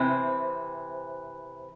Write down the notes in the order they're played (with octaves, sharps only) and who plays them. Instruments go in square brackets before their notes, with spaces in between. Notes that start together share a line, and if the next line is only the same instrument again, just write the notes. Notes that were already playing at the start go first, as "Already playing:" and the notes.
Already playing: [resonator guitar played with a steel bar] C3 E3 C4 [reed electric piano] C5 E5